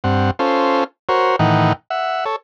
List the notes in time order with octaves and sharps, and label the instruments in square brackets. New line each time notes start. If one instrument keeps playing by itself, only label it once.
[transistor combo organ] G2 C4 F#5
C#4 F4 A4 C5
F#4 A#4 C5 C#5
A2 D#3 E3 D#4 F#5 G5
E5 F#5
A4 C#5